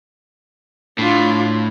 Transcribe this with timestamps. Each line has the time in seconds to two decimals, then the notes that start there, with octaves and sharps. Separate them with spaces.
0.98 A2 D4 F4